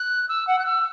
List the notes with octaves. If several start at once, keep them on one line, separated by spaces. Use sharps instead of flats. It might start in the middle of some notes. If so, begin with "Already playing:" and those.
Already playing: F#6
E6
F#5
F#6
E6